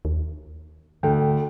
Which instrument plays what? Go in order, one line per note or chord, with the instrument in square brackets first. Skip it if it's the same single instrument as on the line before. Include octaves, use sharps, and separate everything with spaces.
[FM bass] D#2
[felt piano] D2 [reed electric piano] A4 G5